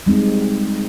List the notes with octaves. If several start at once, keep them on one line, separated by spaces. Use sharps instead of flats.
G3 G#3 C4 D#4